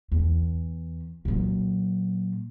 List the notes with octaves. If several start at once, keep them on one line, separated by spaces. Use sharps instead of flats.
E2
A#2 F#3